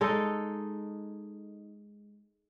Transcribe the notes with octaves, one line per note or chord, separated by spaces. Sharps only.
G#3 D#4 A4